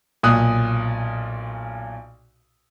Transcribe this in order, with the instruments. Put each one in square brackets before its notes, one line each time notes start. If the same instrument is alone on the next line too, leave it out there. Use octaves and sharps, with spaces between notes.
[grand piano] B1 A#2 D#6 F#6